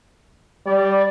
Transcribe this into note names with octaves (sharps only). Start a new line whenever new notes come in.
G3 D5